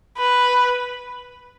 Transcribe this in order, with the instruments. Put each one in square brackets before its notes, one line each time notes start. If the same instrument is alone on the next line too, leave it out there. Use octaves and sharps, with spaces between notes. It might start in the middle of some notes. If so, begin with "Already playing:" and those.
[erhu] B4